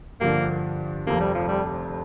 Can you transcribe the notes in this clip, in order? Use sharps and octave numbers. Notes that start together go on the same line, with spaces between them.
G2 D3 F3 A#3 D4
F1 F2 C3 A#3
G3
F3
G3